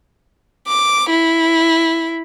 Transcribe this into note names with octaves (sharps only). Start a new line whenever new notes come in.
D6
E4